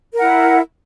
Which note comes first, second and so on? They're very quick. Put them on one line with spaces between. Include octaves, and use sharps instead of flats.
A#4 F#5 E4